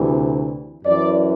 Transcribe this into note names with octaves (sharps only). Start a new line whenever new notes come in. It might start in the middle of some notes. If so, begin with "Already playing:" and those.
Already playing: D2 C3 E3
F#2 E3 D5